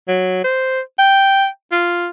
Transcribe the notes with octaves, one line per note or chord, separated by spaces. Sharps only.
F#3
C5
G5
F4